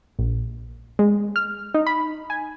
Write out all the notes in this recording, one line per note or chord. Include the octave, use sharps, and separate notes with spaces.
A#1
G#3
F6
D#4
B5
G#5